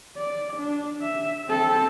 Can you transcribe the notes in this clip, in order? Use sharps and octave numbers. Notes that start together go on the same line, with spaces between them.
D5
D4
E5
C4 A4